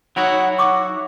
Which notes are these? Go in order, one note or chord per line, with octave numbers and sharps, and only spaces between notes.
F#3 D#4 E4 F#4 C#5 F#5 D#6
F#5 C#6 D6